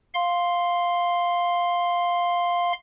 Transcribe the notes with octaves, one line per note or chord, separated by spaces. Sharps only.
F5 C6